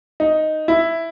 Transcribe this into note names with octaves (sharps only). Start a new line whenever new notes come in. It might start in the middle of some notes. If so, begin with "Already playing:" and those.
D#4
E4